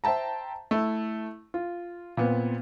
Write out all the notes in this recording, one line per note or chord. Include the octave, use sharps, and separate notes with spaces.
C5 E5 G5 A5 A#5
A3 E4
F4
A#2 B3 C4